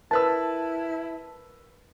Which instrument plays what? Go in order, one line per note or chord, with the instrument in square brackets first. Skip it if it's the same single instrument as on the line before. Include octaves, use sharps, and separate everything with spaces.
[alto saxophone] E4 [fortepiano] A#4 B4 E6 [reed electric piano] A5